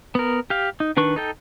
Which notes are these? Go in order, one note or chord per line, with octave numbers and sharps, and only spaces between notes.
B3 A#4
G4 F5
D#4
D#3 D4 B4 C#6
D#4 A4 G5